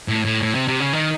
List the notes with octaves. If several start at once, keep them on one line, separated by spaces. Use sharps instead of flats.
A2
A2
A2
C3
C3
C#3
D#3